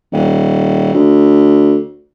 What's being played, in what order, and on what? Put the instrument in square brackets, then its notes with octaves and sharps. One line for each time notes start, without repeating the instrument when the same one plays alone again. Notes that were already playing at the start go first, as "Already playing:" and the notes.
[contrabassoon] D#1
D2